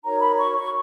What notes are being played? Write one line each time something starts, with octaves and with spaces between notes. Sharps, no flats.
D#4 F#4 A#4 C#5 A#5
B5
C#6
C#6